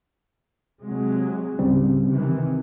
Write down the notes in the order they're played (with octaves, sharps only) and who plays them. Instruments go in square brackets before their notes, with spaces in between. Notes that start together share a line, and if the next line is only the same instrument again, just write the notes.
[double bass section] C3 F#3 G#3
[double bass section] C#2 G#2 [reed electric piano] C#3 G3 C4
[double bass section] C3 D#3 E3